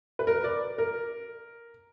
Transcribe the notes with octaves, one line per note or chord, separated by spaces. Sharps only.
B4
A#4
D5
A#4